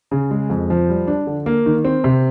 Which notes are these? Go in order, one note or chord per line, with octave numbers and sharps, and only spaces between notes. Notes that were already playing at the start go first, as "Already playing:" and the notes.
C#3
G#3
F2
F3
G3
D4
D3
A#3
D#3
C4
C3